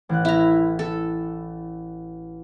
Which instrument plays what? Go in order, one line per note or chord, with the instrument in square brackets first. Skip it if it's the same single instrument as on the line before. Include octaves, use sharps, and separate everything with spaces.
[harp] A1 F#6
[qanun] E4 A#5
A4